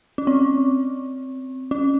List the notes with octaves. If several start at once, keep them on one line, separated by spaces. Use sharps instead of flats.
C#4
C4
C#4